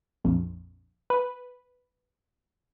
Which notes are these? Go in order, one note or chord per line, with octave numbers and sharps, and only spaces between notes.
A#1 F2
B4